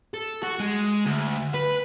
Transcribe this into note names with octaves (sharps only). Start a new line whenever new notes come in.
A4
F#4
G#3
D2
B4